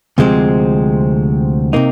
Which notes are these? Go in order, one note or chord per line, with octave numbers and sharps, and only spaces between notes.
D2 C3 F3 G#3 C4
C3 A#3 D#4